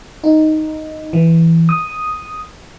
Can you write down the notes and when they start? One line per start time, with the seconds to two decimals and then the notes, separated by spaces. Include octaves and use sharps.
0.24 D#4
1.13 E3
1.69 D#6